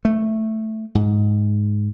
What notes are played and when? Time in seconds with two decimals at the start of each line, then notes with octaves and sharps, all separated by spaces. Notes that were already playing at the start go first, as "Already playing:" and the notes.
0.05 A3
0.95 G#2